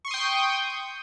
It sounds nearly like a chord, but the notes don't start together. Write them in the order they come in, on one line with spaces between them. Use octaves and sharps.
C#6 C6 D#6 G5 G6